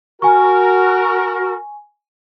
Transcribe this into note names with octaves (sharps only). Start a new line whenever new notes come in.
F#4 A#4 G#5 C#6